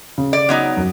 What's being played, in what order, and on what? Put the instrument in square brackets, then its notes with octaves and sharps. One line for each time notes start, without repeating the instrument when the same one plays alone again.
[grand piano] C#3
[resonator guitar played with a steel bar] D5
F#3 B3 D#4
[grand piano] F#2